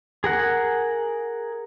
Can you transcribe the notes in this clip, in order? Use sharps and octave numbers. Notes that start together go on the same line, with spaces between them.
G#4 A#4 F#5